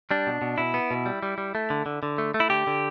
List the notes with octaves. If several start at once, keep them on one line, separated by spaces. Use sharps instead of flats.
G3 D4
B2
B2
B2 E4
B3
B2
G3
G3
G3
A3
D3
D3
D3
A3
A3
E4
D3 G4
D3